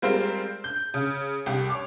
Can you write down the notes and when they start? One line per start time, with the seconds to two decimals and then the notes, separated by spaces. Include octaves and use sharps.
0.02 G3 G#3 C4 F4 A#4 C5
0.64 G6
0.94 C#3
1.46 C2 G4
1.69 C#5 D6